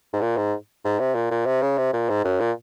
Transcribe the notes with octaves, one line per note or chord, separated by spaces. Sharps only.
G#2
A#2
G#2
G#2
C3
A#2
A#2
C3
C#3
C3
A#2
G#2
F#2
A#2